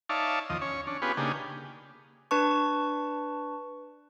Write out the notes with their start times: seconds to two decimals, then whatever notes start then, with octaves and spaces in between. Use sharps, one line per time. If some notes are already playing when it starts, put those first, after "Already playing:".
0.09 D#4 C#5 D5 E5 F5 A5
0.50 D#2 F3 D#5
0.61 C#4 C#5
0.87 C#4 D4
1.02 B3 C#4 F4 G4 G#4 B4
1.17 C#3 A#3 D4 D#4 G4 G#4
2.31 D4 B4 A5 C#6